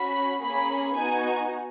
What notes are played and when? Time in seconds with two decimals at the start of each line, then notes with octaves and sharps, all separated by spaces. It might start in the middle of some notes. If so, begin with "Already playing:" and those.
Already playing: C#4 F#4 B5
0.41 A#3 C#4 G#4 B5
0.95 B3 D#4 F#4 G#5